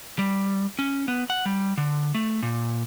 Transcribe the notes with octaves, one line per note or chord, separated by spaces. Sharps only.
G3
C#4
B3
F#5
G3
D3
A3
A#2